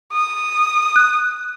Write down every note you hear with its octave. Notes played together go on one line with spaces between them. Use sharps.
D#6
F#6